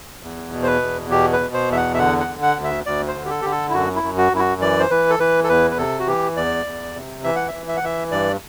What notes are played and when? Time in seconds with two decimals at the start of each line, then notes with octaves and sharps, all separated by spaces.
0.23 E2
0.52 B2
0.63 C5
0.67 B4
0.82 E2
1.10 B2 G4
1.33 B4
1.40 B2
1.54 C5
1.70 E2 E5
1.77 F#5
1.94 E5
1.98 D3 F#5
2.20 F#5
2.28 D3
2.42 F#5
2.57 D2
2.64 E5
2.86 D2 D5
3.08 C5
3.16 D3
3.25 G4
3.30 A4
3.42 D3 G4
3.51 A4
3.70 E4
3.74 F#2 F#4
3.96 E4
4.03 F#2
4.18 F#4
4.32 F#2 E4
4.39 F#4
4.61 E3 D5
4.79 C5
4.90 E3 B4
5.10 A4
5.19 E3 B4
5.44 A4
5.49 E2 B4
5.71 B4
5.78 C3 A4
5.99 F#4
6.07 E3 G4
6.36 E2 D5
6.66 E2
6.95 C3
7.24 E3 E5
7.36 F#5
7.48 E5
7.54 E3
7.68 E5
7.77 F#5
7.83 E3 E5
8.12 G2 D5